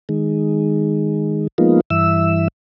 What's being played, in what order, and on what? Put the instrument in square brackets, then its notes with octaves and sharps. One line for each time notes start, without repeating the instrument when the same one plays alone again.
[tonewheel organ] D#3 G#3
F3 G#3 A#3 B3 D#4 F4
G2 E3 E5 E6